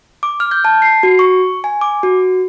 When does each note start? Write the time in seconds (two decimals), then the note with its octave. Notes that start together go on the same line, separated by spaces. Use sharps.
0.23 D6
0.40 F6
0.51 G6
0.65 A5
0.82 C7
1.03 F#4
1.19 C#6
1.64 G#5
1.81 D6
2.03 F#4